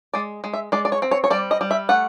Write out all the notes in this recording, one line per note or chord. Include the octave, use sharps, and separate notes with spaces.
G#3 D5
G#3
E5
G#3 D5
D5
C#5
C4
C#5
C#5
G3 D5
D#5
G3
E5
A3 F#5